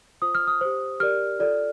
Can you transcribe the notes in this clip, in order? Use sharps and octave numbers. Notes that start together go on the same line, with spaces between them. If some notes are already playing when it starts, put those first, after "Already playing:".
F4 C5 D#6
F6
D#6
G4 C5
G4 A#4 D5 F6
F4 A4 D5